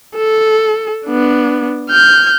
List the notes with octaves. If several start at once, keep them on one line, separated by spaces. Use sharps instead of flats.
A4
B3 D4
F6 G6